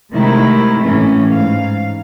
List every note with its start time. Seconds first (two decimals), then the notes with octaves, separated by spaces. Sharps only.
0.11 C3 D#3 G#3 A3 E4
0.83 A2 E3 C#4
1.29 G#2 F5